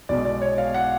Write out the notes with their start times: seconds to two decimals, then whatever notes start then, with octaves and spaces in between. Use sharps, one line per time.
0.09 B1 B2 G#3 D5
0.25 D5
0.42 C#5
0.58 F5
0.74 F#5